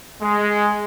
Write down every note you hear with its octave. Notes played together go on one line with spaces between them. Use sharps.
G#3